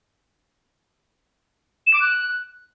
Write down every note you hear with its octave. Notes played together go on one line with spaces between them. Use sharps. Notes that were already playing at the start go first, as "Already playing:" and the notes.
E7
D6
F#6